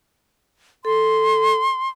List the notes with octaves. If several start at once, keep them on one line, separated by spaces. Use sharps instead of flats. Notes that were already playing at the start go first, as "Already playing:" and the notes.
A4 C6